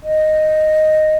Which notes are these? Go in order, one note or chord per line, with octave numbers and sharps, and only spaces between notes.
D#5